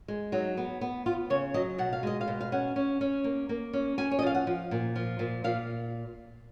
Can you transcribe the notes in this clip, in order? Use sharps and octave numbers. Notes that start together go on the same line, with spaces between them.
G#3
F#3 D#4
B3
B3
B3 F4
C#3 C#5
F#3 D#5
B2 F#5
F5
G#3 D#5
F5
B2
F5
C#4 F#5
C#4
C#4
A#3
A#3
C#4
C#4 G#5
C#5
D#5
F3 F5
F#5
F3
A#2
F3
A#2
A#2 F5